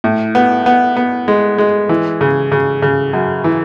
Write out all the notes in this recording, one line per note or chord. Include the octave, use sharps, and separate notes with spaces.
A2
B3
B3
B3
G#3
G#3
E3
C#3
C#3
C#3
F#2
E3